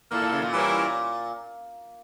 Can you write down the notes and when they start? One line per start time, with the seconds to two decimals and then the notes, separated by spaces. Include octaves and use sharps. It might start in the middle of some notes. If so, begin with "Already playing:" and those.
0.12 A#2 A#3 E4 A4
0.22 A#2
0.32 C#3
0.42 A#2
0.54 E3 G3 C#4 E4 A#4